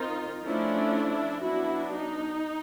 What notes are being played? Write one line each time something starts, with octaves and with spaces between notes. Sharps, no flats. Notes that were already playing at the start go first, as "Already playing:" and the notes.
Already playing: D#3 C4 D#4 F4
F3 A3 C#4 D4 E4
F#3 B3 D4 E4 F#4
D#4